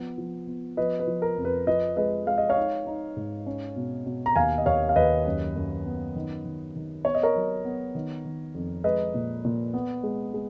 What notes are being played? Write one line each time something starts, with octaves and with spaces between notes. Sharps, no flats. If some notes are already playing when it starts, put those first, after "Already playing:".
Already playing: F3 B3
F3
B3
F3 B4 D#5
B4
F3
A#4
F2
B4
F3 B4 D#5
G#3 B4 D#5
G#3 F5
D#5
C#5 F5
D#4
D#4
G#2
C#4
B2
B2
A#5
D#2 F5 G#5
D#5
D#2 C#5 F5
F5
D#2 B4 D#5
F#2
F#2
B3
D#3
D#3
D#3
B3 C#5
D#5
A#4 C#5
F#3
B3
D#3
D#3
F2
G#3 B4 D#5
A#2
A#2
B3
G#3
G#3